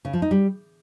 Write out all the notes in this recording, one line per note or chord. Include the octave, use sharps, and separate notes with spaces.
C#3
F3
D#4
G3